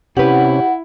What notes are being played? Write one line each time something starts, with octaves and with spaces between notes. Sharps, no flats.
C3 C#4 E4 G4 B4 F#5